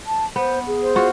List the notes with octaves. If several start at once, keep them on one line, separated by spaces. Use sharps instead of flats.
A5
B3 C5
G#4
C5
F4 F#4